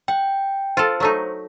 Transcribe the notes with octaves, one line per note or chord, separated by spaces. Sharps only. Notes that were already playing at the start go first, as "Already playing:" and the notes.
F#5 G5
F4 A4 C5
F#3 A3 D#4